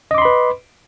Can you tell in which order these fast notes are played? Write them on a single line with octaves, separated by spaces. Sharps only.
D#5 D6 C6 B5 B4